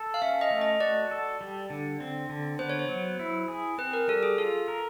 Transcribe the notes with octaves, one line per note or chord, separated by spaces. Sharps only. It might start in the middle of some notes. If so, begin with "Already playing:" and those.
Already playing: A4
F5
C#4 E5
D#5
A3
D#5
F#4 D5
A4
G3
D3
C4
D3
B3 C5
C#5
C5
F#3
E4
G#4
C4 B4
A#4
G3 A4
G#4
F4 A4
A#4